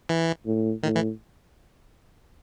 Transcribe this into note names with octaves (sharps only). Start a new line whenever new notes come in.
E3
A2
A2 D#3
E3